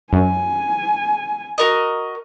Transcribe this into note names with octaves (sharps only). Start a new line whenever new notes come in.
F#2 G#5
F#4 A#4 D#5